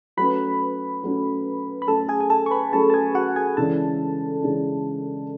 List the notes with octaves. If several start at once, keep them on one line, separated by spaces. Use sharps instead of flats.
F#3 A3 C#4 B4 B5
F#3 A3 C#4
B5
F#3 A3 C#4 A4 A5
G#4 G#5
G#5
A4 A5
C#6
B4 B5
F#3 A3 C#4 A4 A5
A5
G#4 G#5
F#4 F#5
G#4 G#5
C#3 E3 G#3 D4 A4 A5
C#3 E3 G#3 D4